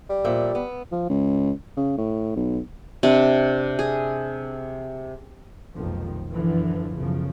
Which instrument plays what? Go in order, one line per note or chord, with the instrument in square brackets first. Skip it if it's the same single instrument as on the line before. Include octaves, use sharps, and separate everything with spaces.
[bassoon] G3
[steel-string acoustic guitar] A#2 F3 E5
B3
[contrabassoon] F3
C#2
C#3
A2
B1
[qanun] C3 D4
G#4
[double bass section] F1 B1 F2 D#3 F3
F#2 D3 E3 F3
B1 F#2 C#3 F3